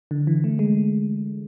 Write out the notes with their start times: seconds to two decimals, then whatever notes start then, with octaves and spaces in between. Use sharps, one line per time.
0.11 D3
0.27 E3
0.44 A3
0.59 G#3